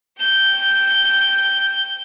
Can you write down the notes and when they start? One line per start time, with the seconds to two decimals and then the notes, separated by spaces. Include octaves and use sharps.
0.20 G5 G6